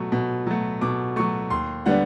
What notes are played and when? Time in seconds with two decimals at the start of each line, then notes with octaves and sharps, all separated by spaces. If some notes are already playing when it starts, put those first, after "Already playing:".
Already playing: B2 F#3 A3
0.12 B2
0.47 F#3 A3
0.81 B2 D6
1.16 F#3 A3 C#6
1.50 D#2 C6
1.86 D3 G3 B3 D4 F#5